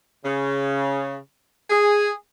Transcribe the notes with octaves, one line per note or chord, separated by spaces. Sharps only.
C#3
G#4